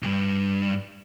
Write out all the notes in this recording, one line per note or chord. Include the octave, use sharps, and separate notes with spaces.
D2 G2